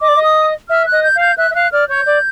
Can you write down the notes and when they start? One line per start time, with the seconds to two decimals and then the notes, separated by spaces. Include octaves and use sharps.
0.01 D#5 D6
0.08 D5
0.16 D#5
0.23 D#6
0.69 E5 F6
0.86 F#6
0.92 D#5
1.03 G6
1.15 F5
1.21 G6
1.37 E5 F#6
1.50 E5
1.55 F5 F#6
1.72 D5 F6
1.89 C#5 G6
2.06 D5